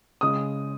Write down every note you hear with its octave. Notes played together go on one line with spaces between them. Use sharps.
C#3 G#3 D#6